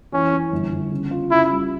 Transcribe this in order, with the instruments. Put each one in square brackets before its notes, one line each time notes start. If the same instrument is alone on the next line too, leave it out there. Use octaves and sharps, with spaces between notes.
[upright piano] E3 [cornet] C#4
[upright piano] E3
G1
G1
C#3
F4
[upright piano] C#3 [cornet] E4
[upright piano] G3